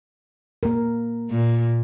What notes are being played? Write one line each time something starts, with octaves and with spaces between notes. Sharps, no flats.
A#3 A#4
A#2